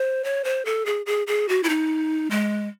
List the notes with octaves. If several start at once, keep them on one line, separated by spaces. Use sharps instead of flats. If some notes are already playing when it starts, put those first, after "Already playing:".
Already playing: C5
C#5
C5
A4
G#4
G#4
G#4
F#4
E4
D#4
G#3